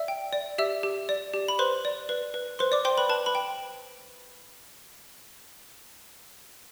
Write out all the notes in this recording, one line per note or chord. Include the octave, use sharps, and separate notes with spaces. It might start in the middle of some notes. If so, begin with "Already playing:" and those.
Already playing: D5 E5 E6
G5
D5
G4 E5 E6
G4
D5
G4
B5
B4 C5 C6
D5
B4
B4
B4 C5 C6
D5 D6
C5 G5 C6
B4 B5
B4 A5
B4 B5
G5